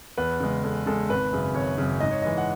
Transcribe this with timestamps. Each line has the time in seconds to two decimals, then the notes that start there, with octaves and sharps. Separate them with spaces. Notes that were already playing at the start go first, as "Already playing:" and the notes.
0.17 E2 B4
0.40 C#3 G#3
0.63 E2 A4
0.86 C#3 G#3 A4
1.09 G#1 B4
1.33 F#2 C#3
1.55 G#1 C#5
1.78 F#2 C#3
2.00 G#2 D#5
2.11 C#5
2.22 E3 G#3 D#5
2.38 F#5